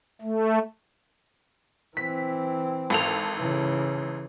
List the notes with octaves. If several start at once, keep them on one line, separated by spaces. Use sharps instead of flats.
A3
E3 C4 B6
G#1 A4 F7
C#3 E3